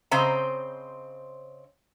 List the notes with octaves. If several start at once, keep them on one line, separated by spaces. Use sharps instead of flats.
C#3 C4 C5 D#5 A#5